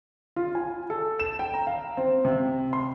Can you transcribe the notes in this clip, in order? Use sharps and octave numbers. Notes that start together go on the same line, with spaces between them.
F4
G#5
A4
E7
G5
A#5
F5
C4
C3
C6